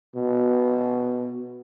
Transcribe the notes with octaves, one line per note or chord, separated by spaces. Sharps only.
B2